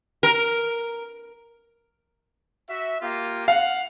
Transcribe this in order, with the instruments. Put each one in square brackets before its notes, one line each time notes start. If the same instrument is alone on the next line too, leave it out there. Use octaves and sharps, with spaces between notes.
[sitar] A#4
[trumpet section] F#4 E5
A#3 F4 G4
[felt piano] F5 [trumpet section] F#5